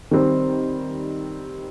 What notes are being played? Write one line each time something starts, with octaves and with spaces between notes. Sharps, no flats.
D#3 G3 C4